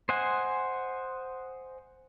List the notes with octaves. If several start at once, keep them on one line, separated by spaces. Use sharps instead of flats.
C5 D#5 F#5 G#5